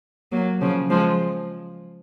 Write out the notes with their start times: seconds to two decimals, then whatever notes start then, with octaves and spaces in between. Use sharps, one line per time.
0.32 F#3 A#3
0.61 C#3 F3
0.90 F3 G#3